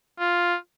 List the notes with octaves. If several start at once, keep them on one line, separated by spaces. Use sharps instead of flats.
F4